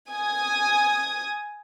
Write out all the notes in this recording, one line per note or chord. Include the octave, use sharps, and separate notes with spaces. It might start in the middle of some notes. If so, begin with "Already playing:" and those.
G#5 D#6